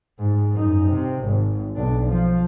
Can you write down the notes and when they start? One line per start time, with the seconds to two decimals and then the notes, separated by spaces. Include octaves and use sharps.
0.19 G#2
0.53 F#2 D#4
0.88 C3
1.24 G#1
1.76 B1 D4
2.06 F3